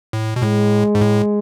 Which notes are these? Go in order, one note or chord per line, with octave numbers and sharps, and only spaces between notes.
A2
B2
A2 G#3
G#2
A2